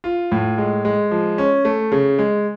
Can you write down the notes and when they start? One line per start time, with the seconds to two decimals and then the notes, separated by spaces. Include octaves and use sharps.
0.04 F4
0.32 A2
0.58 G#3
0.85 G#3
1.11 F3
1.38 C#4
1.65 A3
1.92 C#3
2.19 G#3